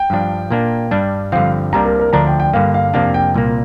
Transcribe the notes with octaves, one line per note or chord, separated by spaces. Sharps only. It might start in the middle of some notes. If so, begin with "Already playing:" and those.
Already playing: G5
G2 F3 D4
A#2 A#3 D4
G2 G3 D4
G2 D3 F3 C4 F5
C2 C3 G3 A#3 D4 A#5
A#4
A#4
D2 D3 F3 D4 A#5
G5
G5
G2 D3 A#3 F5
F5
F2 C3 A#3 D4 F5
G5
C2 A#2 A#3